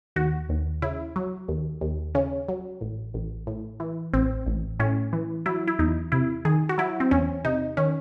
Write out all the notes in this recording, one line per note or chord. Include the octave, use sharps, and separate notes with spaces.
D#2 F#4
D#2
C#3 E4
F#3
D#2
D#2
C#3 C#4
F#3
A1
A1
A2
E3
A1 C4
A1
A2 C#4
E3
F#3 E4
E4
E2 D#4
C3 E4
D#3 G#4
F#4
F#3 E4
C4
E2 C#4
C3 D#4
D#3 C#4